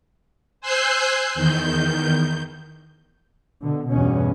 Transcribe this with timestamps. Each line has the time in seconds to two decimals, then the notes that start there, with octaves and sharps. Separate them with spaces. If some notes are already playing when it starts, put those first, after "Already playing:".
0.61 C5 G#5 E6 F#6 G6 C7
1.34 E2 D#3 G6
3.61 B2 D3
3.90 E2 G2 B2 C#4